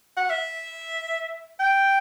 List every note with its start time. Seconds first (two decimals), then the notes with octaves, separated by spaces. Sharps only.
0.17 F#5
0.30 E5
1.60 G5